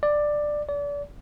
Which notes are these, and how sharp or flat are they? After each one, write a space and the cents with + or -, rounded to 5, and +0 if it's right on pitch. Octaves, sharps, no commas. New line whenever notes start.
D5 +10
D5 -35